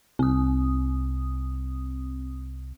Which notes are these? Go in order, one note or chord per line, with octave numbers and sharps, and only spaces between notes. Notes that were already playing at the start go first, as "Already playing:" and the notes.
C2 C4 D#6